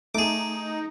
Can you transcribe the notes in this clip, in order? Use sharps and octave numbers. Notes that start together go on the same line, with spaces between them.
A3 D#4 G#4 D6